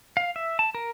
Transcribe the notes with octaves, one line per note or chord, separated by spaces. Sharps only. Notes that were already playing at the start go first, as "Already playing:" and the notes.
F5
E5
A5
A#4